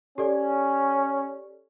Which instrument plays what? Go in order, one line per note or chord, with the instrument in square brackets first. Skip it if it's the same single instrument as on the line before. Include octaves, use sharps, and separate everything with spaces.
[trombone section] C#4 [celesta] G4 A4 D5